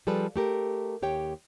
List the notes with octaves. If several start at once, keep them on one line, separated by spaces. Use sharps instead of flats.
F3 G3 G#4 A4 B4
A3 G4 A#4
D#2 G4 C#5 G5